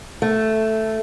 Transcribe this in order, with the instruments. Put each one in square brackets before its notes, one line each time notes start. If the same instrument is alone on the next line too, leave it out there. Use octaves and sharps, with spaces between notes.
[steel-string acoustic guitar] A3